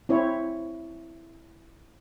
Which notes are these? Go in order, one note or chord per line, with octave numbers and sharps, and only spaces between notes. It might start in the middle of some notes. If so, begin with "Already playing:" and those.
C4 E4 C#5